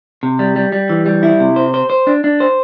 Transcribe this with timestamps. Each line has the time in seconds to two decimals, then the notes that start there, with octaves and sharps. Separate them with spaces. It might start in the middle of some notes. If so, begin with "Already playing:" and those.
0.23 C3
0.39 G3
0.56 G3
0.72 G3
0.90 E3
1.06 G3
1.23 E4
1.40 C3
1.56 C5
1.74 C5
1.90 C5
2.07 D4
2.24 D4
2.40 C5